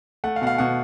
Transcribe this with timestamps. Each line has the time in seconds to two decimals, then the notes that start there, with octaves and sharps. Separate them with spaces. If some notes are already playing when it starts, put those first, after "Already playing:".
0.24 A3 F#5
0.36 F5
0.42 B2 F#5
0.47 F5
0.58 B2 F#5